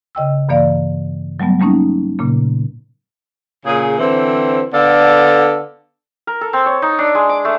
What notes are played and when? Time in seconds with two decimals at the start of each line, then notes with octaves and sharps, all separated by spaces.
0.15 C#3 D#5 G5 E6
0.49 G2 E3 A#3 D5 F5
1.40 F#3 G3 A3 B3
1.60 G3 A3 A#3 C#4 D#4
2.19 A#2 C#3 A#3
3.65 A#2 C#3 G#4
3.98 D3 E3 C4
4.72 D3 B3 A4 D5 F5
6.27 A#4
6.41 A4
6.53 C4
6.66 C#5
6.82 D#4
6.99 D4
7.15 G#3
7.29 D6
7.45 A3